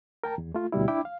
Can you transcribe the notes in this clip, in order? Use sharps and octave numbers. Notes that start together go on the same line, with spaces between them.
A#4 G5 A5 A#5
E2
A3 F4
D2 B2 G3 E4
D4 E4 G5 B5 D6
F5